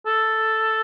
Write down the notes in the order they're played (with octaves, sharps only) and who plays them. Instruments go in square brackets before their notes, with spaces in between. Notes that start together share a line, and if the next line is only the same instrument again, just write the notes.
[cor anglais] A4